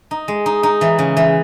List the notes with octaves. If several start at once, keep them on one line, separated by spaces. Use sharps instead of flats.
D#4
G#3
D#4
D#4
E3
C#3
E3